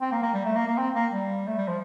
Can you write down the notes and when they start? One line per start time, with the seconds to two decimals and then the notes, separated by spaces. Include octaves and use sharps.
0.01 C4
0.12 A#3
0.22 A#3
0.33 G3
0.45 A3
0.55 A#3
0.67 A#3
0.78 C4
0.94 A#3
1.11 G3
1.47 A3
1.57 G3
1.68 F3